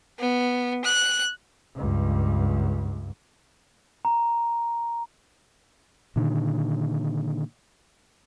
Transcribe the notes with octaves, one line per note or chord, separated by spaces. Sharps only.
B3
F#6
C#2 G2
A#5
A#2 D3 D#3